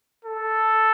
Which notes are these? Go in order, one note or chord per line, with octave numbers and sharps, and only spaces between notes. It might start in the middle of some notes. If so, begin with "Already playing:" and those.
A4